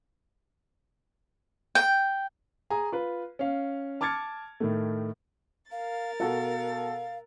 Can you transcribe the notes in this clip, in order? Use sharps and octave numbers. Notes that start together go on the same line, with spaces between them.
G5
G#4 G#5 A#5
F4 B4
C#4 F5
A5 D6 F6 G#6 A6 C#7
A2 D#3 A3
A#4 F5 A6
B2 F#4 A4 F5